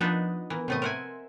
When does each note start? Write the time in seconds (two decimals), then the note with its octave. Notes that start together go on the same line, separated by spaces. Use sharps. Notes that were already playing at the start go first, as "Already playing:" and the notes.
0.01 F3 B3 D4 D#4 D#5
0.50 E3 B3 A#4
0.68 A2 C3 A3 B3 C4 D#5
0.82 A#4 C5 E5 F#5 G#5